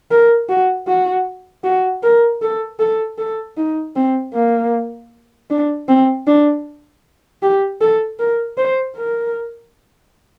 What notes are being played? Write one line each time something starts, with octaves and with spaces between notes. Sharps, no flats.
A#4
F#4
F#4
F#4
A#4
A4
A4
A4
D#4
C4
A#3
D4
C4
D4
G4
A4
A#4
C5
A#4